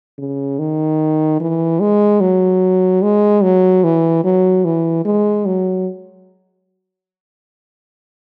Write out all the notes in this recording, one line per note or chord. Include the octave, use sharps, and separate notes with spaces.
C#3
D#3
E3
G#3
F#3
G#3
F#3
E3
F#3
E3
G#3
F#3